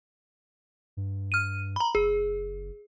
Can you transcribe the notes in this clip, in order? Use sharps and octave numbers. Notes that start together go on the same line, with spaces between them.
G2
F6 D#7
A#5 B5
F#1 G#4